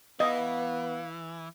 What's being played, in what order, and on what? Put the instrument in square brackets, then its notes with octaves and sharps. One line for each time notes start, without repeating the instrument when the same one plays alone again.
[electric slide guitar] E3 [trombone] B3 [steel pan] D#5 [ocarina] F5